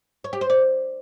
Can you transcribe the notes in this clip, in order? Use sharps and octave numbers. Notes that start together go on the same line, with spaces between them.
C#5
G4
C5
D5